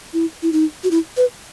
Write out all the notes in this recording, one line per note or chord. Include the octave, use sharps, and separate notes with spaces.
E4
E4
D#4
F#4
E4
B4